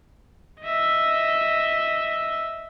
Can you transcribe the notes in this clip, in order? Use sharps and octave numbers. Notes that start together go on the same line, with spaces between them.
D#5 E5